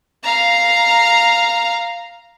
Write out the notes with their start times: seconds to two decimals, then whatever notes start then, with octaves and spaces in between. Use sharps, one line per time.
0.23 F5 A#5